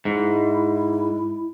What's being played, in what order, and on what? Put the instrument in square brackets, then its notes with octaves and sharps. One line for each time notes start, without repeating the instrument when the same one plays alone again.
[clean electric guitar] G#2 [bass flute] E4